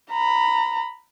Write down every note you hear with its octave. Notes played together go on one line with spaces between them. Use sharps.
A#5 B5